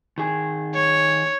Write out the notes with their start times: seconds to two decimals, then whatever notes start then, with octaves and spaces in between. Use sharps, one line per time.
0.18 D#3 G#4
0.75 C#5